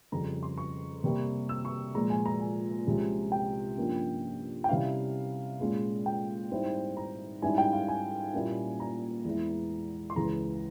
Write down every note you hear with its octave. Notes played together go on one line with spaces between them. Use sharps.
F2 C#3 G3 C#4 A#5
C6
C#6
C3 G3 A#3
E6
C#6
A#2 F3 G#3 A#5
G#5
A#5
G#5
C2 C3 F3 G#3 C#4
G5
G2 F3 A#3 C#4
G5
C3 G3 C#4 E4 F5
A#2 G#3 C#4
G5
G#2 G3 C4 E4
A#5
G#2 G3 C#4 E4 G#5
G5
F5
G#5
A#2 G3 A#3 C#4 E4
A#5
E2 E3 G#3 E4
C6
C#2 C#3 E3 A#5